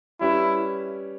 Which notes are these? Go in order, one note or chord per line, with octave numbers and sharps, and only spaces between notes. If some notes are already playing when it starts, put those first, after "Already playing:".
G3 C#4 E4 G4 B4